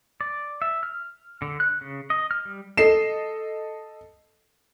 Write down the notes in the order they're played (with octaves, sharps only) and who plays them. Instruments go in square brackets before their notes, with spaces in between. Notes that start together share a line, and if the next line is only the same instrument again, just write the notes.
[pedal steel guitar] D5
E5
F6
D3
F#6
C#3
D#5
F6
G3
[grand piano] A4 D#5 C7 E7